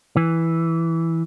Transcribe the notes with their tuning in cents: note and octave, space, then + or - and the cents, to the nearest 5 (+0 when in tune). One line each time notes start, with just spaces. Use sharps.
E3 -5